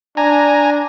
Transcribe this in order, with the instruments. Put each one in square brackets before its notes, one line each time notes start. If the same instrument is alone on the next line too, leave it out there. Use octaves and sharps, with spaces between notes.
[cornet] D4 [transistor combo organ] G#5 A#5